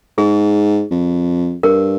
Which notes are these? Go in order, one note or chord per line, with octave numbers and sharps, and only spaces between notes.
G#2 G#4
F2
G2 A#4